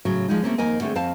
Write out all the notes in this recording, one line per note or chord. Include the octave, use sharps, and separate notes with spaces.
A2 C#3 F#3
F3 G#3 D#4
A3 A#3 C4 C#4
F2 D#3 A#3 A#4 D#5 G#5
D3 A3 C4 G#4
F2 C4 F5 A5